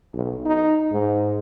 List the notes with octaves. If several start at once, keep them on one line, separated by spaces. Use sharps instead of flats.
B1
D#4
G#2